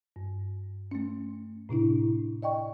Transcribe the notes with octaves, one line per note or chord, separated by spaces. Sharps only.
G2
A3 C#4
A2 C3 D4 E4
D5 D#5 G5 C#6